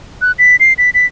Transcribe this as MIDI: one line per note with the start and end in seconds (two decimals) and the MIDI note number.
0.22 0.32 90
0.39 0.56 95
0.60 0.73 96
0.78 0.90 95
0.94 1.06 95